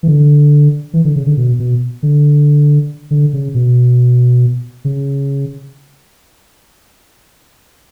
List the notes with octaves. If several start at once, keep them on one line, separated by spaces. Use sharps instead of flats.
E3
D3
E3
D3
C#3
D3
B2
B2
D3
D3
C#3
B2
C#3